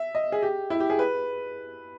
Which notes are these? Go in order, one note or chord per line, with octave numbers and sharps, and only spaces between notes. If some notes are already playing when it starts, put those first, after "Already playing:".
Already playing: E5
D#5
G#4
G4
E4
G4
G#4
B4